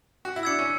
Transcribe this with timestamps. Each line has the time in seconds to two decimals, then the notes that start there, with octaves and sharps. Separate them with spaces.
0.25 F#4
0.36 E4
0.43 D4 E6 G#6 C#7
0.59 C#4